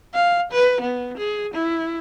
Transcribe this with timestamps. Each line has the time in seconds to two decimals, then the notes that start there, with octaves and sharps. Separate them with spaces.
0.14 F5
0.52 B4
0.81 B3
1.17 G#4
1.54 E4